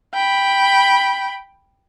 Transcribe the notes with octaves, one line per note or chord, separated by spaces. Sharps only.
G5 B5